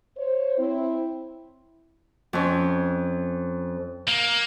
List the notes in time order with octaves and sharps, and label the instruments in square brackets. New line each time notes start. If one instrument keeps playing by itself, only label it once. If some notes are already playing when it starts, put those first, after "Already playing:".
[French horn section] C5 C#5
C4 E4
[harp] F2 C#4
[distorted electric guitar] A#3